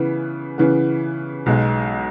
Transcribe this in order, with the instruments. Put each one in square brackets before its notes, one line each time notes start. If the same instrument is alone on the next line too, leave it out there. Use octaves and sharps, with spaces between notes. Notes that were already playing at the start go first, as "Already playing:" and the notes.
Already playing: [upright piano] C#3 E3 B3
C#3 E3 B3
B1 B2 G#3